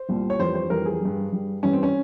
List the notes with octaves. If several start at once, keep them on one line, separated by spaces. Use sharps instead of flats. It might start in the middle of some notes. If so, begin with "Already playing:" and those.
Already playing: C5
C2 A#2 G3
C#5
F2 E3 G3 C5
C5
F2 E3 G3 A#4
G#4
G2 G3
G2 G3
G2 E3 G3 C#4
C4
C#4